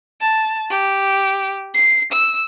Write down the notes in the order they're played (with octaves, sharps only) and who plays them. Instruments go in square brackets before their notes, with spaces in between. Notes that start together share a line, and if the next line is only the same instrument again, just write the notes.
[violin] A5
G4
C7
E6